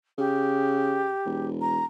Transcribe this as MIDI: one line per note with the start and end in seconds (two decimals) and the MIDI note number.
0.18 1.11 49
0.18 1.49 67
1.26 1.82 28
1.61 1.85 82